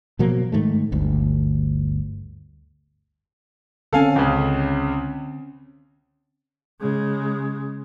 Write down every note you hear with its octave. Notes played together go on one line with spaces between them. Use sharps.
B2 F3 F#3 A#3
G#2 D#3 A3
G1 D2
D3 C4 C#4 A4 F5 G#5
C#2 C#3
C#3 G#3